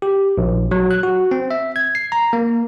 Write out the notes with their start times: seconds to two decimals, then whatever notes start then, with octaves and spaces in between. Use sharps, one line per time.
0.02 G4
0.38 A#1
0.71 F#3
0.91 F#6
1.03 F#4
1.31 C4
1.51 E5
1.76 G#6
1.95 C7
2.12 A#5
2.33 A#3